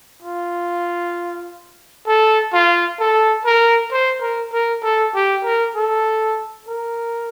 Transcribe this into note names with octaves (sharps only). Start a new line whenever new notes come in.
F4
A4
F4
A4
A#4
C5
A#4
A#4
A4
G4
A#4
A4
A#4